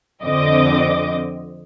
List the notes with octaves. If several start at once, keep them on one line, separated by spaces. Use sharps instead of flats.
F2 D3 C4 D#5 D6